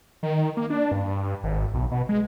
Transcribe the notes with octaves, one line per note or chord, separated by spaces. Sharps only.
D#3
A#3
D4
G2
G#1
B1
B2
G#3